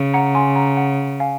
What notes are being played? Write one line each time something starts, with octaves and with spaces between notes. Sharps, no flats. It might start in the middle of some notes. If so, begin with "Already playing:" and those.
Already playing: C#3
F#5 A#5
G#5 C6
F#5 A#5
F#5
F5 G#5